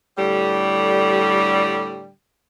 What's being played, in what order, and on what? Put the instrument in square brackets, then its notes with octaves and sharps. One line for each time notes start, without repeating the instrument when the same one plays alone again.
[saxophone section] A2 D3 G3